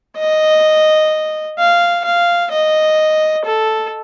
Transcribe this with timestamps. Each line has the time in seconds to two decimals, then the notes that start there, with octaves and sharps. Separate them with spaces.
0.18 D#5
1.59 F5
2.05 F5
2.52 D#5
3.45 A4